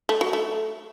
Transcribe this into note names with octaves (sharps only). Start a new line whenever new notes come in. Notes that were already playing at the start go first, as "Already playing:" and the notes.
A3
F#3
A3